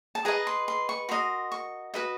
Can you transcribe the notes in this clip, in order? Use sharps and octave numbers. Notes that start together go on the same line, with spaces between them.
A5
G#4 B4 D#5 A#5
C6
C6
C#6
F#4 A#4 D#5 C6
C#6
F#4 B4 D#5